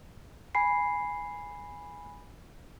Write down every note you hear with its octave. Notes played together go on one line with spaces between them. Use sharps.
G#5 B5 C7